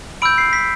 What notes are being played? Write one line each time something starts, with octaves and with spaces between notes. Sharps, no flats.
B5 E6 G6 D7
C7
B6